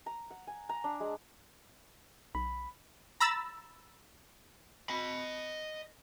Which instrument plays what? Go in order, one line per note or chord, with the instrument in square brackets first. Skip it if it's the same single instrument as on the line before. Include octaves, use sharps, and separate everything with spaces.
[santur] A#5
F#5
G#5
A#5
D4
G#3
[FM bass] B1 [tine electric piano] B5
[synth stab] A#5 B5 E6 A6
[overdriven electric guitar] D#5 B5